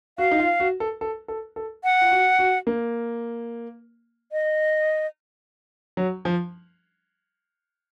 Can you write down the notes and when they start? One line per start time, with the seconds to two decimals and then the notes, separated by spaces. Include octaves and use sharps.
0.18 F#4 F5
0.31 D#4
0.39 F4
0.60 F#4
0.80 A4
1.01 A4
1.28 A4
1.56 A4
1.84 F#5
2.01 F4
2.11 F#4
2.39 F#4
2.67 A#3
4.32 D#5
5.97 F#3
6.25 F3